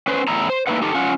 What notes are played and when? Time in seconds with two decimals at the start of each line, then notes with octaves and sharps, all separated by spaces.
0.07 C#4 B4 C5
0.28 E2 A2 E4 A#5
0.50 C5
0.67 A3 A#3 D#4 E4 B4 F#5
0.82 D#4 G4 A4
0.94 C#4 F4 F#5